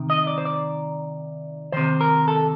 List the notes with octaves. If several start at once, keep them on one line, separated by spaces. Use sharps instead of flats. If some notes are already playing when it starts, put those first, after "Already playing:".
Already playing: C3 D#3
D#5
D5
C5
D5
C3 D#3 C5
A#4
A4